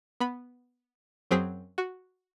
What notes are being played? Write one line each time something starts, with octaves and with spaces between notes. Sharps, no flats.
B3 B5
F#2 F#3 C4 G#4 B6
F#4